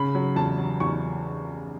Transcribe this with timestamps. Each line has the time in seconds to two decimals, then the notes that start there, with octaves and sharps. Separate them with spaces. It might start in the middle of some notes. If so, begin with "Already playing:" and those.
Already playing: C#3 B5
0.15 F#3
0.36 E2 A5
0.58 F#3
0.80 E2 C#6